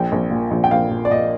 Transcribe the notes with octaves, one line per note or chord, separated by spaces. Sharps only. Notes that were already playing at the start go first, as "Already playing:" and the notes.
Already playing: A#1 G5
A#1
A#2
A#1
G5
A#1 F5
A#2
D5
A#2 D#5